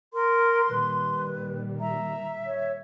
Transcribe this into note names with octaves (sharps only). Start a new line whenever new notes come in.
A#4 C6
A#2 D#3 G3 B4
E5 A#5
C#5